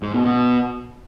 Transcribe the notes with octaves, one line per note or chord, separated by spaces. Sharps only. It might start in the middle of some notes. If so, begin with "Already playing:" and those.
G#2
B2
B2